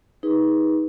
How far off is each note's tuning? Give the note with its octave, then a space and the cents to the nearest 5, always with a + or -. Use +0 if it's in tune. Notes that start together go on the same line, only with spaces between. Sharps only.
D#4 +25 G#4 -10 B4 -15